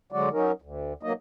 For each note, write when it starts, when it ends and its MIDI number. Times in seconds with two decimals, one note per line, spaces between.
0.12 0.29 50
0.12 0.29 54
0.12 0.29 56
0.12 0.29 66
0.12 0.29 74
0.32 0.52 54
0.32 0.52 61
0.32 0.52 63
0.32 0.52 70
0.62 0.93 38
1.03 1.13 47
1.03 1.13 54
1.03 1.13 58
1.03 1.13 63
1.03 1.13 75